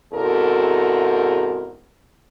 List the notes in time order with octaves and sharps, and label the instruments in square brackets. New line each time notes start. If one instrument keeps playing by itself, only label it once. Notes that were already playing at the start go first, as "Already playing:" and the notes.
[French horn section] E2 G#2 C3 F#4 A4 A#4